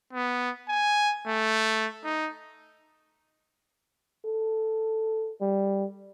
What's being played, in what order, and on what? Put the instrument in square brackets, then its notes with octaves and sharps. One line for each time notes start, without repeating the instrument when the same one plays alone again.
[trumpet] B3
G#5
A3
D#4
[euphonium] A4
G3